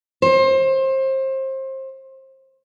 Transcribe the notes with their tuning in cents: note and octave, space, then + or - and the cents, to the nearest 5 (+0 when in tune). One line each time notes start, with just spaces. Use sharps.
C5 +25